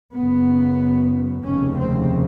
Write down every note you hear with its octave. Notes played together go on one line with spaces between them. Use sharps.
F#1 F#2 C#3 B3
F1 D#2 C#3 C#4
C4